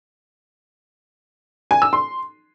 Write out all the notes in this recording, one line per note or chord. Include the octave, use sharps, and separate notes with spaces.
G#5
E6
C6